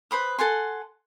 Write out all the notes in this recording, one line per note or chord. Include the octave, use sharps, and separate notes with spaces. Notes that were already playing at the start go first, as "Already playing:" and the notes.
B4 C5 B5 D#6
A4 F#5 G#5 C6